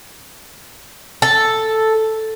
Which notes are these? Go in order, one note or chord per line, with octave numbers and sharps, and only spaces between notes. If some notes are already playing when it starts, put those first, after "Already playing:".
A4